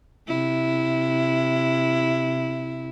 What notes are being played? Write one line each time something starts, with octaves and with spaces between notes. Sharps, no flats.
C3 E4